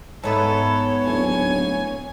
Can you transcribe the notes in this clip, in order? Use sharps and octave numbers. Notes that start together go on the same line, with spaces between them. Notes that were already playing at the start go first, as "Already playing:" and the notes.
G#2 B3 A4 C#5 E5
D1 G#5